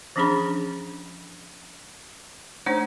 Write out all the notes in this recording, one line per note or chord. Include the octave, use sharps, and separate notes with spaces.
E3 F3 C#4 D4 G#4 B5
A3 D4 D#4 C5 C#5